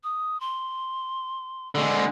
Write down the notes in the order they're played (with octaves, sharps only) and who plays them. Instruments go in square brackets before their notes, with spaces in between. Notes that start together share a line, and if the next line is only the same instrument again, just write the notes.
[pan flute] D#6
C6
[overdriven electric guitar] D3 G#3